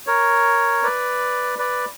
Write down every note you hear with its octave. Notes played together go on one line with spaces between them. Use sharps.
A#4 C#5
B4 D5
B4 D5